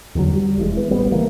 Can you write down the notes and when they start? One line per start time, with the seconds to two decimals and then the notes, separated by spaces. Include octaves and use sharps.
0.15 E2 D3 D#3 F#3
0.33 G3
0.58 E1 E3 G#3
0.77 B3
0.90 A1 G3 B3
1.12 C#3 E3 A3 A#3